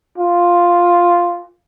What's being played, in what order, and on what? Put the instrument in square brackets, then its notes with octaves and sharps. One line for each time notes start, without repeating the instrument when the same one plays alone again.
[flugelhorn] F4